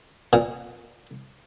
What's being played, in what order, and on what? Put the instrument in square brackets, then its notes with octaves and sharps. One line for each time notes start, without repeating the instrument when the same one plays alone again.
[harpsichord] A#2